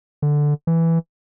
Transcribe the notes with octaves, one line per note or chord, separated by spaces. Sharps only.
D3
E3